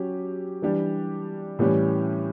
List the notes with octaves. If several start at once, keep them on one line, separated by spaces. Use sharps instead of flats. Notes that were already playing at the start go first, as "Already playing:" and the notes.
Already playing: F#3 C#4 G4
E3 G3 D4 G4
A2 E3 G3 C#4 G4